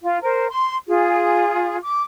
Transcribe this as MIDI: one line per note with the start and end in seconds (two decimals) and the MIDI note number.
0.02 0.17 65
0.21 0.47 70
0.21 0.47 72
0.49 0.76 84
0.88 1.77 65
0.88 1.77 68
1.82 2.03 86